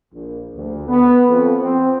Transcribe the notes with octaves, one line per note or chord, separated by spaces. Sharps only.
A#1
D2
B3
F2
C4